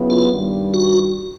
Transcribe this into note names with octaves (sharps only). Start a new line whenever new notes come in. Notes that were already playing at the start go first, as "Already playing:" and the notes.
Already playing: C#3 F#3 B3 E4
F4
G2 D#3 G3
F#4